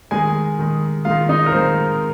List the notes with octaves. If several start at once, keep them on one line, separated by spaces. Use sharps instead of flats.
D#3 G#3 G#4 G#5
D#3 G#3
D#3 G#3 F4 F5
D#4 D#5
A#4
D#3 G#3 C4 C5